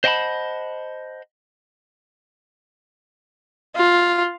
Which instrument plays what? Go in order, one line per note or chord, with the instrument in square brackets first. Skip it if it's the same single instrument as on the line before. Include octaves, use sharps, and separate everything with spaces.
[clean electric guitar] C5 D#5 F#5 G5 A5 B5
[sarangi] F4